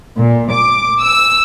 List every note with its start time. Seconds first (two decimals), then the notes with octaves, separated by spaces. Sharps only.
0.18 A#2
0.50 D6
1.02 E6